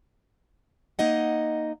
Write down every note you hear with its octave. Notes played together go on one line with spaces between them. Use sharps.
A#3 D#4 D#5 F#5